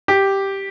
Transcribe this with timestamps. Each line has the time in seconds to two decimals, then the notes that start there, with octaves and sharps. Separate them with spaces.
0.08 G4